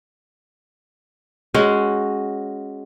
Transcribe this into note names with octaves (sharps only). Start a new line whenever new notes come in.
G#3 C#4 F#4